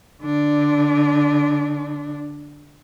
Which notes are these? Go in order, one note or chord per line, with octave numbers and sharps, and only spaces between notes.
D3 D4